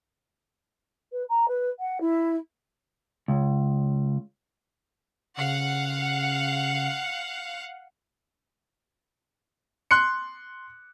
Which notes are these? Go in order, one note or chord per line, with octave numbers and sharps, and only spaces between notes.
B4
A#5
B4
F#5
E4
C#2
C#3 F5 F#5
C6 F#6 C#7